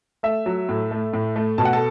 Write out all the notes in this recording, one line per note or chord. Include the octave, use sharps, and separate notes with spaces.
A3 E5
F#3
A2
A3
A2
A3
B2 A5
F#5
A4 A5